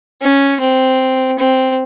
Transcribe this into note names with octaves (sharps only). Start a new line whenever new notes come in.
C#4
C4
C4